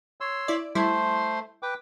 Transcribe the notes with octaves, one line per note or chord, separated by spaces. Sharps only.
C#5 C6 E6
E4 D5
G3 A3 E4 C5 C6
B4 G5 D6